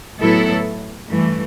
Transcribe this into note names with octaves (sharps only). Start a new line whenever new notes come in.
A2 F#3 B3 E4 A4
G2 E3 A3